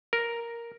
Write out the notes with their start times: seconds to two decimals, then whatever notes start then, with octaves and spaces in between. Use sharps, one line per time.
0.13 A#4